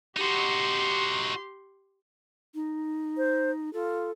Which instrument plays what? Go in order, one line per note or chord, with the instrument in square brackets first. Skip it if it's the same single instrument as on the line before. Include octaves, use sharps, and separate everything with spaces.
[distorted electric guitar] D#4 F#4 [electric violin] G4 C6
[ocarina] D#4
[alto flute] C5
[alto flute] F4 [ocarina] A4